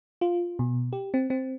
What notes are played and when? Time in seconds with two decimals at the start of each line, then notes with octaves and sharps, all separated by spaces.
0.21 F4
0.59 B2
0.93 G4
1.14 C4
1.30 C4